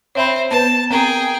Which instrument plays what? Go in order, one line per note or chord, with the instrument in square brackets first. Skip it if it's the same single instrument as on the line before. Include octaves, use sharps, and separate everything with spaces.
[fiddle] C4 C5 [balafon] C#5 E5 B5
[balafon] B3 B4 [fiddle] A5
[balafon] C4 A#4 A#5 [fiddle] G#4 G5